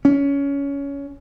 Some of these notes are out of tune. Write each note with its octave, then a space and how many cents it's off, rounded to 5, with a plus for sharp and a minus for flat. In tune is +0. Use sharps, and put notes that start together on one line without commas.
C#4 +20